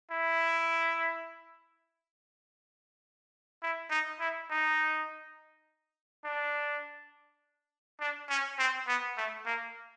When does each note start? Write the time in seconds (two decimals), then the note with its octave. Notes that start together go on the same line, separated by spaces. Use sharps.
0.11 E4
3.63 E4
3.91 D#4
4.20 E4
4.50 D#4
6.25 D4
8.01 D4
8.30 C#4
8.59 C4
8.88 B3
9.17 A3
9.46 A#3